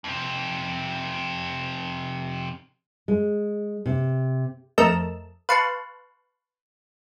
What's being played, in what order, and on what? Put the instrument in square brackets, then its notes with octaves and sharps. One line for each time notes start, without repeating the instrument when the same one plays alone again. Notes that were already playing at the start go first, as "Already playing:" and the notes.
[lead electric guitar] F2 C3
[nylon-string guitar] G#3
C3
[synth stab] F2 A3 A#4 D#5 A5 E6
B4 F5 A5 C6 C#6 F#6